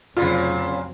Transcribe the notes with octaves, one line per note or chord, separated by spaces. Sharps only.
F1 A#2 C#3 F#3 C4 F4